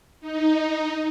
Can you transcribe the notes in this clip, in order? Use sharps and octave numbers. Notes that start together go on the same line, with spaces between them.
D#4